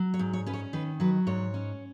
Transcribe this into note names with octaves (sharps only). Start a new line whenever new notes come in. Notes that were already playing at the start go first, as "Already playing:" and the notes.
Already playing: F#3
C#5
G#2
C#5
C#4 B4
C#5
D#3 B4
F#3 B4
G#2 C#5
C#4